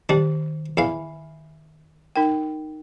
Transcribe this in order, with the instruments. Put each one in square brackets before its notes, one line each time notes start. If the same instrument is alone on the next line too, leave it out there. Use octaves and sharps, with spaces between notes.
[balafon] D#3 [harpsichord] G3 D4
[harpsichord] E2 F5 [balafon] E5 G#5 B5
[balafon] D#4 A#4 G5